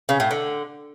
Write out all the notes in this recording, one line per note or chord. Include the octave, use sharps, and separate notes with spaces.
C#3
A2
D3